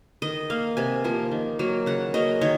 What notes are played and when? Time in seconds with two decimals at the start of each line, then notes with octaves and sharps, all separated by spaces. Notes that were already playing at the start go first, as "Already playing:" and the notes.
0.22 D#3 D#5
0.50 A#3 F5
0.77 C3 G#5
1.04 F3 A#3
1.31 D#3
1.59 F#3 A#3
1.86 C#3 F#5
2.14 F#3 A#3 D#5
2.41 D#3 C#5